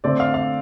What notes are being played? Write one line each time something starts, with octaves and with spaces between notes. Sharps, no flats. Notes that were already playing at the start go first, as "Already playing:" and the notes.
D3 A3 C4 D5
F5
F5